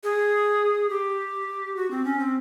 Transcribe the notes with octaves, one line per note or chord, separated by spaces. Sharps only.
G#4
G4
F#4
C4
C#4
C4